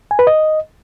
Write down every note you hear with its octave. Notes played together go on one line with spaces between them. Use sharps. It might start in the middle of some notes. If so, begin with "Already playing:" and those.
G#5
B4
D#5